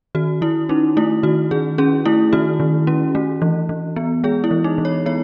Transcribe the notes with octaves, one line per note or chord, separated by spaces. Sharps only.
D#3 F#4
D#3 E4
C#4 D#4
A3 E4
D#3 F#4
D#3 G#4
C#4 G#4
A3 E4
D#3 F#4
D#3
C#4
A3
E3
E3
B3
G#3 G#4
E4
E3
D#4
E3
C#5
B3 C#5